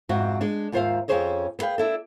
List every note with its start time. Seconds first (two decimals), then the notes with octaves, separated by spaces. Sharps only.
0.09 F2 G#2 C3 C4 F#4
0.41 G#3 D4
0.72 D#2 G#2 F4 C5 E5 F5
1.08 F2 C#4 G#4 C5 C#5 D#5
1.59 B3 G#4 B4 F5 G5
1.78 D4 E4 A4